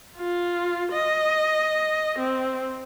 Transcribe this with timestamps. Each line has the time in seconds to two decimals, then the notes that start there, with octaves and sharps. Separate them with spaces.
0.17 F4
0.92 D#5
2.18 C4